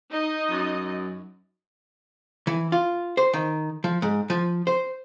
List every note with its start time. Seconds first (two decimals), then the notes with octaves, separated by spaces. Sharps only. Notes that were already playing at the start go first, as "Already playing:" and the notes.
0.12 D#4 D#5
0.51 F#2
2.47 E3
2.72 F4
3.17 C5
3.33 D#3
3.84 F3
4.02 G#2
4.30 F3
4.67 C5